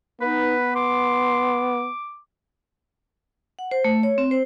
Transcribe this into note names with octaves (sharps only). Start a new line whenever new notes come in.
B3 D#4 B4
C6 D6
F#5
C5
A3
C#5
C4
C5